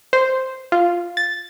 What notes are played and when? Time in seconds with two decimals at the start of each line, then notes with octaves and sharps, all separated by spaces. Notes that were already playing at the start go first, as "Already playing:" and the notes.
0.13 C5
0.72 F4
1.17 A6